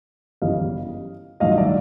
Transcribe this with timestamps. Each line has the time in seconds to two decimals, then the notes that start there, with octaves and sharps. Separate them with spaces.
0.41 G1 F#2 C#3 E3 G3 D#5 F5
1.40 A1 G2 D#3 F#3 D#5 F5
1.52 D#5
1.58 D5 E5